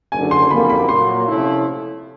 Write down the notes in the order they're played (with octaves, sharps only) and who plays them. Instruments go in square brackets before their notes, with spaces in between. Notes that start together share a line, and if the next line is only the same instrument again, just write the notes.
[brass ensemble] F#1 F#2 D3 [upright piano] G#5
[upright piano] C6
[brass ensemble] F#1 F2 D3 G3 A#3 [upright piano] B5
[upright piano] B5
[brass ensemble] A#2 F#3 A#3 [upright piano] C6
[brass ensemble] C3 F3 A3 C#4 E4